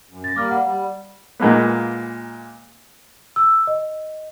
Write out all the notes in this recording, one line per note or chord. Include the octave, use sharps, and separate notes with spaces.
F#2
A6 A#6
G3 A#3 D6 F6
F#5
G3
A#2 G#3 A#3 B3
E6
D#5